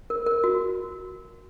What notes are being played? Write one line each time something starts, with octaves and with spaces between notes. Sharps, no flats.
A#4
A#4
F#4